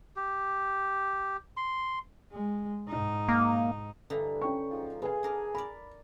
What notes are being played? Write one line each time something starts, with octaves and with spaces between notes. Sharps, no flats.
G4
C6
G#3
G#2 D#4
A#3
G2 D3 E3 D#4
C#4 G5 C#6
G#2 F3
F4 G#4 B4 G#5
D4 A#4 D#5
A#4 D5 B5